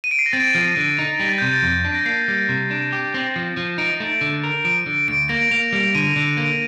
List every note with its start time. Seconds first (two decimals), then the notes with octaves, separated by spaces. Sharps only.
0.04 D#7
0.11 D7
0.19 C7
0.26 A#6
0.33 C4 A6
0.55 F3
0.77 D3
0.99 D#4
1.20 G3 A#6
1.29 A6
1.38 C3 G6
1.48 A6
1.63 F2
1.85 D4
1.95 A#6
2.06 A#3 C7
2.28 G3
2.49 C3
2.71 D4
2.93 G4
3.14 C4
3.36 F3
3.57 F3
3.78 D#4 D7
4.00 A3
4.21 D3
4.44 A#4
4.65 F3 D7
4.86 D3
5.08 D2 D7
5.29 A#3 A#6
5.51 A#3 F7
5.73 G3
5.95 D3 D#7
6.16 D3
6.37 A#3 D7